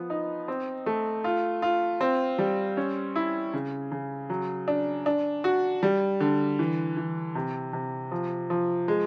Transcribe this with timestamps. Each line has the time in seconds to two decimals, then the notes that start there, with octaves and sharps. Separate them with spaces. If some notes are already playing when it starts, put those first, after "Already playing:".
Already playing: F3 B3
0.10 D#4
0.48 C4
0.86 A3
1.24 F4
1.62 F4
2.01 C4
2.39 G3
2.77 C#4
3.16 E4
3.53 C#3
3.92 C#3
4.30 F#3
4.68 D4
5.06 D4
5.44 F#4
5.83 G3
6.20 D3
6.59 E3
6.97 E3
7.35 C3
7.73 C3
8.12 F3
8.50 F3
8.88 G#3